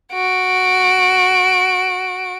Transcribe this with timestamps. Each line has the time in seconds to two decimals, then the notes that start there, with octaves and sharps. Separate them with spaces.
0.12 F#4 D7